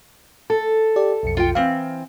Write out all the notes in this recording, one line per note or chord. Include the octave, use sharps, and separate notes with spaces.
A4
G4 D5
B1 F2 C#7
F4 G5
E3 C4 F5